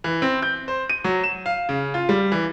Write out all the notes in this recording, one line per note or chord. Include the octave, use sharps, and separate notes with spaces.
E3
C4
G6
C5
D#7
F#3
E7
F5
C#3
F4
G3
E3